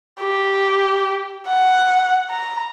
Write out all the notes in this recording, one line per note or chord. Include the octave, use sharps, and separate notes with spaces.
G4
F#5
A#5